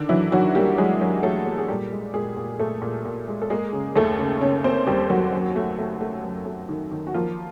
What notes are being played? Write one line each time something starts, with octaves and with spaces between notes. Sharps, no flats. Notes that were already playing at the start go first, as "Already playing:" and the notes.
Already playing: D3 D#3 D4
E3 F#3 E4
D#3 F#3 F#4
G3 A#3 G4
F#3 G#3 G#4
F#3
F#3 A3 A4
A#3
G#4
A#2 G3 G4
G#3
A#2 G#3 G#4
A#2
A#2 A3 A4
A#2
A#2
G#3
A4
G#3 A#3 G#4
C#3
D#2 A3 A4
C#3
C#3 C#4 C#5
A#3 C4 C5
D#2 G3 G4
D#2 F#3 F#4
F#2
A3
A3
A3
F#2
A3
D#3
D#3
F#4
F3 A#3 F4